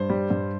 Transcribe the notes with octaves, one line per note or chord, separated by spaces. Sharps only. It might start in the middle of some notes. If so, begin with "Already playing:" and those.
Already playing: G2 C5
G3
G2